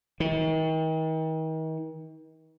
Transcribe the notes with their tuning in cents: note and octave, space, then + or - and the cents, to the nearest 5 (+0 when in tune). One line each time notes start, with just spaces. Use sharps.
D#3 +40